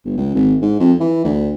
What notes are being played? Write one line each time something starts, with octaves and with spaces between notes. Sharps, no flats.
G1
C#2
G#1
G#2
F2
E3
D2